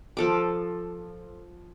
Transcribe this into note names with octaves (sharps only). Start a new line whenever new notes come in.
F3 A4 D6